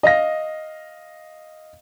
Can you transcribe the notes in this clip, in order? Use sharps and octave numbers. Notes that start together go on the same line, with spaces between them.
D#5 F5 A#6